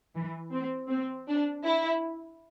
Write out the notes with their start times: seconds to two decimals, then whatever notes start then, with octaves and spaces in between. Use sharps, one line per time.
0.16 E3
0.53 C4
0.90 C4
1.28 D4
1.65 E4